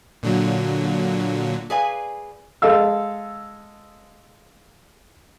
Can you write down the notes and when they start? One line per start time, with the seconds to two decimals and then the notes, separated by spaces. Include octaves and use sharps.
0.23 A#2 D3 F#3
1.70 G#4 B4 D5 F5 G#5
2.62 G#3 A4 F5 E6